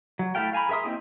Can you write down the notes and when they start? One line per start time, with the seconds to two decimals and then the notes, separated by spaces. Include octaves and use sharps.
0.19 F#3
0.35 A3 E4 A4 F5 G5
0.53 F5 G#5 A#5 B5
0.69 G#4 A#4 E5 C6 D#6
0.85 A#3 C4 D#4 E4 G4